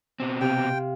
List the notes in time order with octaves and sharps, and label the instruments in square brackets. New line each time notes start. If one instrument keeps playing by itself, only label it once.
[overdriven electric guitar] B2 C4
[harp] C3 F5 [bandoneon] G5